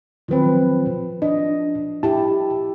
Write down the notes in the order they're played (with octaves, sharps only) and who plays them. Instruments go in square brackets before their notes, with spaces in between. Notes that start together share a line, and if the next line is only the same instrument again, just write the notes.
[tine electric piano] D#3 F#3 C4 [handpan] F3 B4
[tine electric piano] D4 [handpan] D#5
[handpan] E4 G4 [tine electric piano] A5